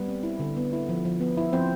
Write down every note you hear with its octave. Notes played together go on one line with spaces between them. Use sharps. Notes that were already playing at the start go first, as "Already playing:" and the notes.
Already playing: G3 B3 B4
C4
E4
D3
B3
E4
F3
F3
B3
E4
F3 C4 C5